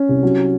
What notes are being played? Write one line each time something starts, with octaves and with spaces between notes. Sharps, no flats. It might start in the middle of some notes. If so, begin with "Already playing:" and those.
Already playing: C#4
C2
F#3